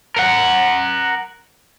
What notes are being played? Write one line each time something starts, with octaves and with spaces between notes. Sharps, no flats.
A#4 F#5